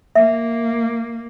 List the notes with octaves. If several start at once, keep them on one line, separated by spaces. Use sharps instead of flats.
A#3 E5